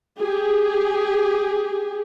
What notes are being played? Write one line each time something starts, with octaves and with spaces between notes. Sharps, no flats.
G4 G#4